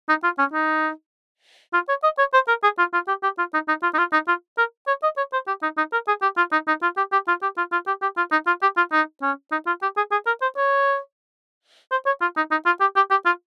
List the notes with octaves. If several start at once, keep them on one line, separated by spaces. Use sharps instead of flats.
D#4
F4
C#4
D#4
F4
C#5
D#5
C#5
C5
A#4
G#4
F4
F4
G4
G4
F4
D#4
D#4
F4
D#4
F4
D#4
F4
A#4
C#5
D#5
C#5
C5
G4
D#4
D#4
A#4
G#4
G4
F4
D#4
D#4
F4
G4
G4
F4
G4
F4
F4
G4
G4
F4
D#4
F4
G4
F4
D#4
C#4
D#4
F4
G4
G#4
G#4
A#4
C5
C#5
C5
C#5
F4
D#4
D#4
F4
G4
G4
G4
F4